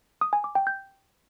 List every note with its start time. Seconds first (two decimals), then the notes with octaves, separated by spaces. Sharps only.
0.21 D#6
0.33 G#5
0.44 D6
0.55 G5
0.67 G6